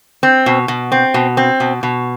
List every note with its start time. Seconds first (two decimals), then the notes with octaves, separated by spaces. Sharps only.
0.23 C4
0.46 B2
0.68 B2
0.92 C4
1.14 B2
1.37 C4
1.60 B2
1.83 B2